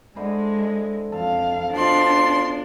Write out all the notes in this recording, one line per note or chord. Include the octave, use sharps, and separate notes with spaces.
D3 G#3 E4 C5
F2 A4 F5
B2 F3 D4 F4 C6